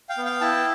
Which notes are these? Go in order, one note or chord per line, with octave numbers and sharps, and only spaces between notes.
F5 G5
B3
F5 G5
E4 G5 A5